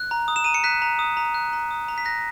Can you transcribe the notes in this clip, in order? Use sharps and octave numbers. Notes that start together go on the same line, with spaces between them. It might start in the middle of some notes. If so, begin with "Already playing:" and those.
Already playing: F#6
A#5
D#6
E7
A#5 D#7
C#7
F#6 B6
A#5
D#6
A#5
F#6
A#5
D#6
A#5
B6
F#6 A#6